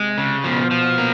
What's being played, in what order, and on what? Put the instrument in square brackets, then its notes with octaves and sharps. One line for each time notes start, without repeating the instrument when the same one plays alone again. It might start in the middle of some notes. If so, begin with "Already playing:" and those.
Already playing: [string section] C3 [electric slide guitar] G#3
[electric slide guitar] C#3
[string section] B2 [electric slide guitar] F3
[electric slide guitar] F3
A#3